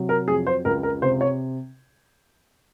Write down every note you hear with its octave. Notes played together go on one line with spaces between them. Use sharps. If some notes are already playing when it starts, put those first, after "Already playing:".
Already playing: C3 F#3
A#4
F2 G#4
C5
C#2 A#4
A#4
C3 C5
C#5